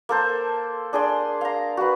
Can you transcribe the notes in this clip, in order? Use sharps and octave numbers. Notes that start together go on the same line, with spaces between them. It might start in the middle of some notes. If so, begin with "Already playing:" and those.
A#3 A4 C5
D4 G#4 D5 C6
F5 A#5
F#4 B4